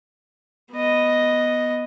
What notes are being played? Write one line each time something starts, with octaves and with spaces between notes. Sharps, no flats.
B3 D#5